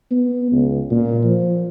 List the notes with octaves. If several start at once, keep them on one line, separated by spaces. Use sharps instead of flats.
B3
C#2
A#2
F3